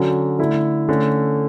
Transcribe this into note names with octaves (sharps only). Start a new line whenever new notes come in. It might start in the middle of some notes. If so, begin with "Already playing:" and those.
Already playing: D3 F#3 C#4
D3 A3 E4
D3 A3 C#4